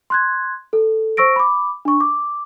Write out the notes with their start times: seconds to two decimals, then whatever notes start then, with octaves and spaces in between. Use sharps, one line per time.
0.10 C6 F#6 G#6
0.73 A4
1.17 C5 C#6 E6 A#6 D7
1.36 B5 D6
1.85 D4 C#6
2.00 D6